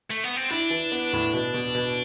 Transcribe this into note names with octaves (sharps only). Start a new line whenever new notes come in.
A3
B3
C4
D4 E4
E3
B3
A2
B2
B2
B2